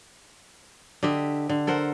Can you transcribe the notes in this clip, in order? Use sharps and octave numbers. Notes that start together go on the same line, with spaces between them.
D3 G4 D#5 E5
D3
A4 A#4 C5 F#5